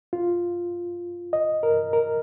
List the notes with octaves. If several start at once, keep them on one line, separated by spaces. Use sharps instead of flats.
F4
D#5
A#4
A#4